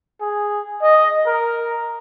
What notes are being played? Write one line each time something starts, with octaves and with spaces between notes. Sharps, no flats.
G#4
D#5
A#4